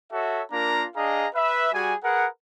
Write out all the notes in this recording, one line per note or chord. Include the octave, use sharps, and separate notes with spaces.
F#4 A4 C#5 E5
A#3 D4 F4 A#4 A#5
D4 G#4 D#5 F5 A#5
B4 E5
G3 F#4 G#4 G#5
G#4 A#4 B4 F#5